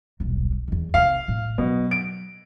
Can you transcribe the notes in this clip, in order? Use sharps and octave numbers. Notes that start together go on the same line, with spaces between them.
D#1 B1
E2 D#3
C3 D#3 F5
A2
B2 F#3
D7